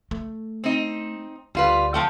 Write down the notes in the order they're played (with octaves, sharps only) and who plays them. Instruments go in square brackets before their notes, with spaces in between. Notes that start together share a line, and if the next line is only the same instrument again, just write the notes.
[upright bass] A3
[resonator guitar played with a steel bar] C4 D#4
[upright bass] D2 [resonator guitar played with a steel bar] G3 F4 B4
[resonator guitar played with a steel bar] F3 A3 G5